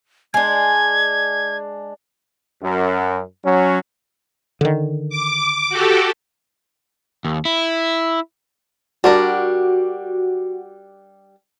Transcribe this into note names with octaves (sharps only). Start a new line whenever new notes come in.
G#3 D4 G#6
F#2
F#3 C#4
D3 D#3
D6
F#4 G4 A4
D#2
E4
G3 D4 F#4 A#4